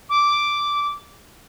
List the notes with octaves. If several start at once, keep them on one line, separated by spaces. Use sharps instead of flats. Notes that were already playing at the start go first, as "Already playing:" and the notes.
D6